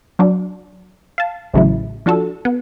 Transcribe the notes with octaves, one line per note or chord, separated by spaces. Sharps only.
F#3 D4
F5 A5
A1 A2 C#3 F#3 E4
F3 D4 F#4 A4
B3